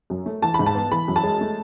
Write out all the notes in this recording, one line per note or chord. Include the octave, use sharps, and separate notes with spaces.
F#2
A3
E3 A5
G#2 B5
A5
B3
E3 B5
F#2
A5
G#3
A3